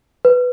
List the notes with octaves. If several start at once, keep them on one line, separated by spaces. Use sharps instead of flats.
B4